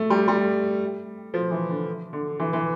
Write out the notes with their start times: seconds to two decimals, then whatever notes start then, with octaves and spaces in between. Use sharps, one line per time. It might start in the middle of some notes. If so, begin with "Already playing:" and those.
Already playing: A3
0.10 G3
0.28 G3
1.34 F3
1.51 E3
1.69 D3
2.13 D3
2.40 E3
2.53 E3